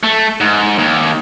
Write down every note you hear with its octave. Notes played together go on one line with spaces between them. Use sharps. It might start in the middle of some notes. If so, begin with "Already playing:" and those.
A3
G#2
D#2